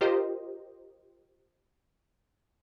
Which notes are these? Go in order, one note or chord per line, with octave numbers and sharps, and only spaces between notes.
F4 G4 A#4 C5 D#5